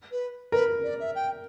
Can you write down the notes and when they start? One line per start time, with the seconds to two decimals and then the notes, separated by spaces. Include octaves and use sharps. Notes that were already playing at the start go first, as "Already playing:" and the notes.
0.11 B4
0.52 A#4 B4
0.84 D5
1.00 E5
1.15 G5